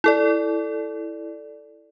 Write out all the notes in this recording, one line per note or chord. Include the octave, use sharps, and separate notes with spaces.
E4 A4 D5